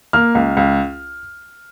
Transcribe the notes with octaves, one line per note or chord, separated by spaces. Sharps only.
A#3 F6
C#2
C#2